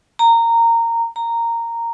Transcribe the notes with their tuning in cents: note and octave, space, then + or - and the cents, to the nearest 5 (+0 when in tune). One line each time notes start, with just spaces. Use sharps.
A#5 -15
A#5 -10